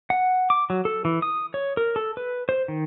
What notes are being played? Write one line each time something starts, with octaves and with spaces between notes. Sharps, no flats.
F#5
D6
F#3
A4
E3
D#6
C#5
A#4
A4
B4
C5
D#3